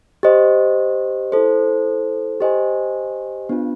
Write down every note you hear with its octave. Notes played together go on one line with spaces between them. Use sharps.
G4 C5 D#5
E4 A4 C5
G4 C5 D#5 G#5
B3 D4 F4